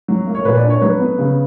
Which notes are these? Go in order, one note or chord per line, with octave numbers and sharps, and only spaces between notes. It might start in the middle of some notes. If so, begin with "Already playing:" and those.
F#3
A#3
C#5
A#2 B4
D5
D4
C#5
F#3 B4
B3
C#3